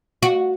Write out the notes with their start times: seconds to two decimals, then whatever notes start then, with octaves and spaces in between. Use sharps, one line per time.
0.23 F#4